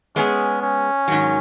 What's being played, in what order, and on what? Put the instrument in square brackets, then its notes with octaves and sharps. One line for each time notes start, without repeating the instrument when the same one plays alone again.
[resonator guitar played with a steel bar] G#3 B3 G#4 [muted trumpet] C#4
[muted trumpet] C#4
[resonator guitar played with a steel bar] G#2 D#3 F#3